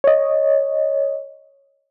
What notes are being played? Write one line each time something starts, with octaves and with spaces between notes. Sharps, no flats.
C#5 D#5